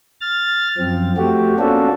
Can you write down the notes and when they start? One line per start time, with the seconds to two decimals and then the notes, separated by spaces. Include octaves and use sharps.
0.21 F6 A6
0.78 F#2 F3 C4
1.17 A3 C4 F#4 G4
1.59 A#3 C#4 D4 F4 F#4 A4